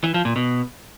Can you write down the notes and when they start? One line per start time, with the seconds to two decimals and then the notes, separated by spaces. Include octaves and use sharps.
0.04 E3
0.14 F3
0.25 A#2
0.36 B2